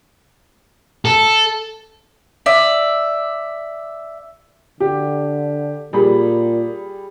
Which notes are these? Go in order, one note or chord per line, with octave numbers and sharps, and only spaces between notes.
A4
D5 E5
D3 G4
A#2 G3 G#4 B5